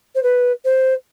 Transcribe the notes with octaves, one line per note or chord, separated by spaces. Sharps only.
C5
B4
C5